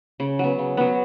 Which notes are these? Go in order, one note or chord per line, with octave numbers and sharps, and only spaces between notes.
C#3
F#3 B3
C#3
F#3 B3